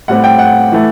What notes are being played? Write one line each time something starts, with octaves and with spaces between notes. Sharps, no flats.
A2 G3 C4 F#5
G5
F#5
E3 A3